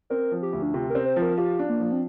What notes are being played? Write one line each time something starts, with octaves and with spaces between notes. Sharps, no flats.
C4 A#4
F3
G4
D2
D4
C3 F4
A#4
C4
C5
F3
A#4
F4 G4
D4
A#3
F3
C4